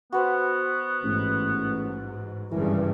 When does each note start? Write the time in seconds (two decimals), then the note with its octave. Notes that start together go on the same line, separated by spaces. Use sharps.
0.12 B3 F#4 B4 C5
1.04 A1 G#2
2.51 G#1 G2 C#3 E3 A#4